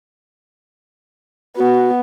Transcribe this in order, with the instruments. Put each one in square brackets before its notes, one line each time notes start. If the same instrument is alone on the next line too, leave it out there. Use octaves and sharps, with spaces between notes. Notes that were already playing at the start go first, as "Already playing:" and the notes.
[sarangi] B3 [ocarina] F#4